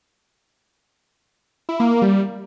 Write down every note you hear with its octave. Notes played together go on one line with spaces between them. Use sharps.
E4
A#3
A#3
G3